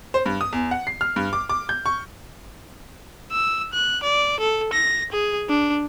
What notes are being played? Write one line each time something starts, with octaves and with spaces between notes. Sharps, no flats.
C5
G2
D#6
E2
F#5
C7
F6
G2
D6
D6
G6
C#6
E6
F#6
D5
A4
A#6
G#4
D4